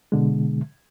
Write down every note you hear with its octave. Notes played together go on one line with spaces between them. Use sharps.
B2 D3 G#3